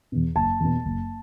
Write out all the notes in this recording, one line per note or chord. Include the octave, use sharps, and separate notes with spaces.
E2 B2
F#1 A5
E2 B2
F#1